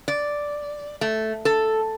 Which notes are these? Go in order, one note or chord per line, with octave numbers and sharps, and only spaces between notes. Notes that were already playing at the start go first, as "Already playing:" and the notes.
D5
A3
A4